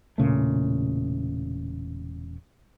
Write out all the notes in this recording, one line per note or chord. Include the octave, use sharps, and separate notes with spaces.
E1 A#2 C#3 A3